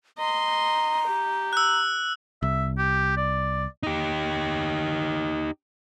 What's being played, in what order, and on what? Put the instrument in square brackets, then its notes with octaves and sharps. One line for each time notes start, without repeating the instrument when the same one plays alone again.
[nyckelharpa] D#5 C6 [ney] A#5
[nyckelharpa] G4
[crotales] E6 F#6
[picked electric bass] C2 [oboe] E5
[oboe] G4
D5
[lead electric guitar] D#4 G4